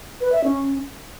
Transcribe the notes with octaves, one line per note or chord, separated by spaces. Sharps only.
B4
E5
C#4